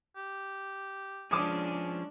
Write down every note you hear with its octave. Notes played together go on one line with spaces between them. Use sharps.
G4
F3 G#3 C#4 D4 G#4 D6 D#6